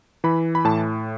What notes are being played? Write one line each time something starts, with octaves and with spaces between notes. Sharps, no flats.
E3 B5
B5
A2 A5